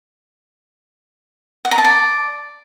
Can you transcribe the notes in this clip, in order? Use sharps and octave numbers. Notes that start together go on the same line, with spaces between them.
F#5
A#5
A5
D5